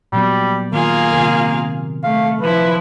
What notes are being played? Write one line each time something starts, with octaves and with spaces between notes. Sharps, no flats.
A#2 F#3 G3 B3
D#3 A#3 F4 G#4 F5
C3 D#3 A#4
A3 F5
F3 E4 B4